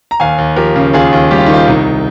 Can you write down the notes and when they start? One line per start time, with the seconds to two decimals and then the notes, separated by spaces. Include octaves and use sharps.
0.11 A#5
0.20 D#2 F5 G#5
0.38 D#2
0.56 F3 G4 A#4
0.76 C#3
0.93 D#2 F4 G#4
1.12 D#2
1.31 G3 G4
1.38 F4
1.46 D#3 D#4
1.54 F4
1.68 C2 D#4